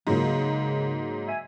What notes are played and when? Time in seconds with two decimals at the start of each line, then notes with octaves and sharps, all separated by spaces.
0.07 G#2 C#3 F#3 A#3
1.26 E5 G#5